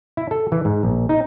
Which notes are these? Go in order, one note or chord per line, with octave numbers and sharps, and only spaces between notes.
E4
A4
E3
G#2
A#1
D#4